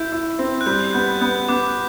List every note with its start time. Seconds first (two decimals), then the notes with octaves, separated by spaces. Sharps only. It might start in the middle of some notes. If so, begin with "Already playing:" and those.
Already playing: E4 G6
0.12 E4
0.39 C4
0.61 F#6
0.66 G3 G6
0.93 B3 G6
1.21 B3 G6
1.49 B3 D6